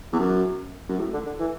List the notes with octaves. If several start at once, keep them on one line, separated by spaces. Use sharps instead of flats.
E2
F#2
F#2
A2
D3
D3
E3